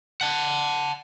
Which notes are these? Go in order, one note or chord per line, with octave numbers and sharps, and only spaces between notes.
F#5 A5